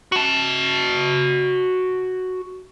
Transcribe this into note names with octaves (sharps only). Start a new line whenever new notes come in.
F#4 A5